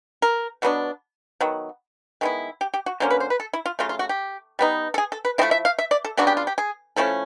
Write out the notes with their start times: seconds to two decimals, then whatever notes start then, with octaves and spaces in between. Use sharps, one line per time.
0.22 A#4
0.62 B2 F#3 B3 D4
1.41 D#3 F#3 B3
2.21 D#3 G#3 B3 E4
2.61 G4
2.74 G4
2.86 F#4
3.00 D3 F#3 A#3 C#4 C5
3.10 B4
3.20 C5
3.30 B4
3.40 A4
3.53 E4
3.66 F4
3.79 C#3 F#3 A3 F4
3.89 F4
3.99 F#4
4.09 G4
4.59 G3 B3 D#4
4.94 A4
4.98 G#4
5.12 A4
5.25 B4
5.38 C4 E4 D#5
5.41 F3 A3
5.51 E5
5.65 F5
5.79 E5
5.91 D5
6.05 A4
6.17 C#3 F#3 B3 D4 F#4
6.27 G4
6.37 F4
6.47 G4
6.58 G#4
6.96 F3 A3 C#4 E4 A4